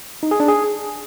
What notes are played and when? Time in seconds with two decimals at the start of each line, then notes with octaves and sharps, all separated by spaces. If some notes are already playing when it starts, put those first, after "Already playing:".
0.23 D#4
0.31 G#4
0.40 D4
0.48 G#4